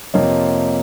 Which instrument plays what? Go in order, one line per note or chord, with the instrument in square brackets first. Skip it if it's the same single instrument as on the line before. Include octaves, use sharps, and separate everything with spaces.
[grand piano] F2 C3 F3 A#3 [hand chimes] C#5 D#5